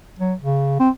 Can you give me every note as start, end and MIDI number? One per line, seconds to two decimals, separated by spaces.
0.19 0.33 54
0.42 0.75 49
0.80 0.90 60